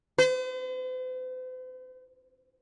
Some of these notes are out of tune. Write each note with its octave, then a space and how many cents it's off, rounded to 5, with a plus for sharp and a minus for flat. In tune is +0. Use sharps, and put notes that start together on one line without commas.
C5 -45